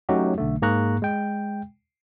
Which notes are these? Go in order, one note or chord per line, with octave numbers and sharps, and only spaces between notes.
F#3 A3 C#4 D#4 F#4 G4
B1 D3 A3
G#2 A#3 G#4 A#5 C#6 F#6
G#3 G5